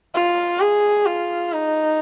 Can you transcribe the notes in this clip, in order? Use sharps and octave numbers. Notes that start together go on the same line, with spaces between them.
F4
G#4
F4
D#4